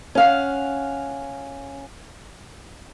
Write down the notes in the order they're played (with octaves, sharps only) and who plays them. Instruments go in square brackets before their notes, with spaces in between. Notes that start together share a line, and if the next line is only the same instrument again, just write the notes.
[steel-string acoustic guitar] C#4 F5 F#5